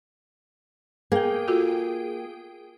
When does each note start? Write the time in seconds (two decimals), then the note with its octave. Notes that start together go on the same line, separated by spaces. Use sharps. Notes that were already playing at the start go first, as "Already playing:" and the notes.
1.12 A#3 G#4 G5
1.48 F4 F#4 A4